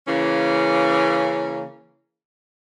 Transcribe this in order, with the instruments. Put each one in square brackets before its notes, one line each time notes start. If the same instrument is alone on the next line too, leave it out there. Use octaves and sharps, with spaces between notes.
[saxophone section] C#3 E3 A#3 C#4